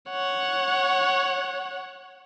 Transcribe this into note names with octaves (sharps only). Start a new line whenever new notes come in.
C#5 F#5